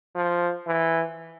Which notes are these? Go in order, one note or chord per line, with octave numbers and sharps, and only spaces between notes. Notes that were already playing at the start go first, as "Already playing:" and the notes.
F3
E3